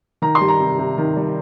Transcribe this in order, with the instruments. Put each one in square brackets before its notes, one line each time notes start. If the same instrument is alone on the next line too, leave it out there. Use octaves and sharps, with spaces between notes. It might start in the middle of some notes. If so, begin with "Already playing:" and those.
[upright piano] D#3 A#5
C6
G3
A#5
C3
C3
D#3
G3